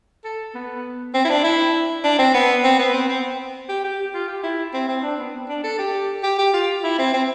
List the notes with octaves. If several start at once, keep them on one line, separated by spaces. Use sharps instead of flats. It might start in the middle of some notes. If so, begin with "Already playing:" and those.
A4
B3
C4
E4
D4
E4
D4
C4
B3
C4
B3
C4
C4
G4
G4
F4
G4
E4
C4
C4
D4
B3
D4
A4
G4
G4
G4
F4
E4
C4
C4